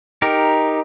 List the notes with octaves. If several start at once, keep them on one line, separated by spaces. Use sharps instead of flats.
D#4 G4 A#4